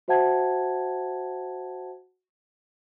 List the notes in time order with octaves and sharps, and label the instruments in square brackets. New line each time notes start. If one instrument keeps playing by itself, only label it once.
[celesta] F#4 C5 E5 F#5 A5 G#6